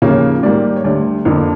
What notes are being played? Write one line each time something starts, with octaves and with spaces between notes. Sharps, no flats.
D#2 C#3 F3 A#3 C#5
G#2 D#3 G3 A#3 D5
C#5
D2 D3 G3 D5
F2 D3 F3 A#3